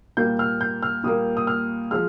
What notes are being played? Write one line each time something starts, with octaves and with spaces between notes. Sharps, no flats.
A#2 G3 A#3 G6
F6
G6
F6
A#2 G3 A#3 D#6
D#6
F6
F3 G#3 F6